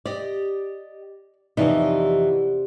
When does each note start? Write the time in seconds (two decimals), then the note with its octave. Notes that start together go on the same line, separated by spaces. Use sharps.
0.06 G4 D5 D#5
1.57 F2 C3 E3 G3 D#4 F#4